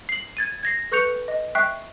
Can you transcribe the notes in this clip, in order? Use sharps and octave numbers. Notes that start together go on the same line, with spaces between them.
C7 F#7
G#6 A6 D#7
G#6 A#6 C7
A4 B4 C#6 G6 C#7 F7
D#5
E5 G5 C#6 F#6 C7